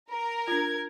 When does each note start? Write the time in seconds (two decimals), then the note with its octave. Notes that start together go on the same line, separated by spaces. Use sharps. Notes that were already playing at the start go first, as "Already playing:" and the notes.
0.11 A#4 A#5
0.48 D4 F4 G#6